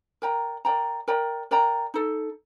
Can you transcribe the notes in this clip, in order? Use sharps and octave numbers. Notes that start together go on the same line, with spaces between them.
A#4 D5 G5 A#5
A#4 D5 G5 A#5
A#4 D5 G5 A#5
A#4 D5 G5 A#5
D#4 A4